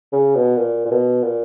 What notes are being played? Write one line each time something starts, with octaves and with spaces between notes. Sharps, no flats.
C#3
B2
A#2
A#2
B2
A#2